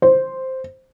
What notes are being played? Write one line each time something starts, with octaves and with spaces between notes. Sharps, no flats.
C5